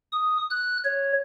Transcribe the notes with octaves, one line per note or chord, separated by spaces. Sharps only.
D#6
F#6
C#5